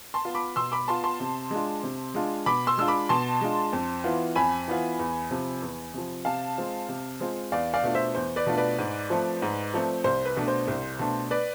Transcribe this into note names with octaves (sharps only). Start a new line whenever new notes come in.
A5 C6
B3 F4
B5 D6
B2 C6 E6
B5 D6
B3 F4 A5 C6
A5 C6
C3
G#3 D4 F4
C3
G#3 D4 F4
B2 B5 D6
C6 E6
G#3 D4 F4 E6
B5 D6
B2 A5 C6
G#3 D4 F4
F2
E3 B3 F4
F2 G#5 B5
E3 B3 F4
E2
C3 F3
E2
C3 F3
C3 F5 A5
G#3 C4 F4
C3
G#3 C4 F4
E2 D5 F5
D5 F5
B2 A3 D4 F4
C5 E5
E2 C5
B4 D5
B2 A3 D4 F4
B4 D5
G#2
F3 A3 C4
G#2
F3 A3 C4
C2 C5
B4
B2 A3 D4
C5
C2
B2 A3 D4
B4 D5